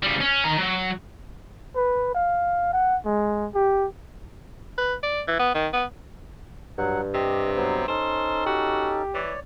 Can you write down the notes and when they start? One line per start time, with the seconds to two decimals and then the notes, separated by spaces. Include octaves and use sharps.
0.03 C#3 G3
0.21 C#4
0.44 D#3 A#5
0.58 F#3
1.75 B4
2.14 F5
2.73 F#5
3.05 G#3
3.55 G4
4.78 B4
5.03 D5
5.28 E3
5.39 B3
5.55 D#3
5.73 B3
6.78 G2 F#3 F#5
7.14 C3 G4 D#5
7.57 F#3 B3 C5
7.88 C#4 D#4 A4 C5
8.46 F#4 G4
9.14 E3 C#5 D5